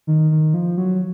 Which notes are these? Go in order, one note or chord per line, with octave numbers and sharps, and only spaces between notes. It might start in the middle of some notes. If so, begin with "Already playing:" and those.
D#3
D#3
F3
F#3